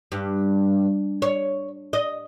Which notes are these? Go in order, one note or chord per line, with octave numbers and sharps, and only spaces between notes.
G2
C#5
D#5